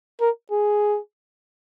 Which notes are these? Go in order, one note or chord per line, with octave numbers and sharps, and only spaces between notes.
A#4
G#4